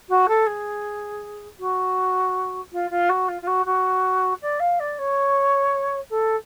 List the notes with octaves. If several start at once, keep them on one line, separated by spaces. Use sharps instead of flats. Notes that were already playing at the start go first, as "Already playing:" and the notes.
F#4
A4
G#4
F#4
F4
F4
F#4
F4
F4
F#4
F#4
D5
F5
D5
C#5
A4